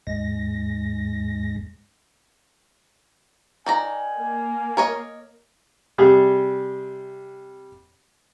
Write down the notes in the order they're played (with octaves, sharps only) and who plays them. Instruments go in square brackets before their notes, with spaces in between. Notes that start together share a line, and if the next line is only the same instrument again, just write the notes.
[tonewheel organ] D#2 G#2 G#3 A#6
[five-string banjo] D#3 D5 A#5 [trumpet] G#5
[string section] A#3
[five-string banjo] A#4 C#5 D#5
[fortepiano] C3 G3 G4 G#4